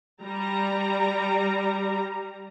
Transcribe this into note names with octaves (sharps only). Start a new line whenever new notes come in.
G3 A#5